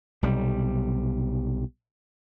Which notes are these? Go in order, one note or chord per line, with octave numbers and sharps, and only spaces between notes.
B1 C3 G3